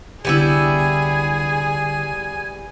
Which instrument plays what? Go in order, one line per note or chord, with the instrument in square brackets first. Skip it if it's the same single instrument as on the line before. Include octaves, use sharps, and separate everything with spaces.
[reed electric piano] C2 D3 [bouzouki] G3 B3 E4 [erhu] G#4 [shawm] G#5